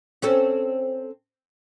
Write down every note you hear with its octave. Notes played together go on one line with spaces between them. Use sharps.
C4 C#4 A4